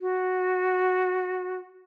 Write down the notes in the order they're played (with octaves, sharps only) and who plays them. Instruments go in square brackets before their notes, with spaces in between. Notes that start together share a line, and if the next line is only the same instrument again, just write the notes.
[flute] F#4